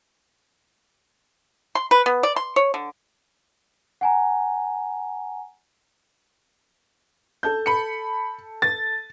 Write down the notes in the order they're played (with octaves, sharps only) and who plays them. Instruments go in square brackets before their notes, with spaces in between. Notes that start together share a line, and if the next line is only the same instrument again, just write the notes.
[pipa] C6
B4
B3
D5
C6
C#5
D3
[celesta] F#5 G#5 A#5
[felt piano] A4 A5 G6
[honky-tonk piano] B5 C#7
A6